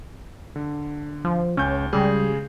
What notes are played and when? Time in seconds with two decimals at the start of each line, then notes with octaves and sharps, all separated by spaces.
0.56 D3
1.25 F3
1.57 C#2 C#4 G6
1.93 C#3 G3 G#3 G#4